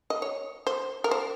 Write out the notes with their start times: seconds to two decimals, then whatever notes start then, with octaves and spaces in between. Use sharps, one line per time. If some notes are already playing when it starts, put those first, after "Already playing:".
0.10 D#5
0.22 C#5
0.67 C5
1.04 A#4
1.11 C5